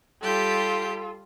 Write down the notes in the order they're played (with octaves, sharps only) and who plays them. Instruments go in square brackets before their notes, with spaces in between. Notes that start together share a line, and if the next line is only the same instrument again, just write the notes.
[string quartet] G3 G4 G6 [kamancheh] F4 A4